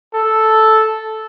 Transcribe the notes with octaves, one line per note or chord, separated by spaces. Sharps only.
A4